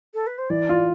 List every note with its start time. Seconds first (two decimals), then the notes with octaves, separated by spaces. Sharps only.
0.14 A4
0.27 B4
0.38 C5
0.50 E3 D5
0.69 F4